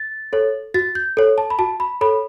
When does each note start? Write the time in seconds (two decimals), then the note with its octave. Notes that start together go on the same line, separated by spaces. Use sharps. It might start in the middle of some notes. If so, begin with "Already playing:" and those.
Already playing: A6
0.33 A4 C#5
0.74 F#4 A6
0.95 G6
1.17 A4 C#5
1.38 A5
1.50 B5
1.59 F#4 A5
1.80 B5
2.01 A4 C#5 B5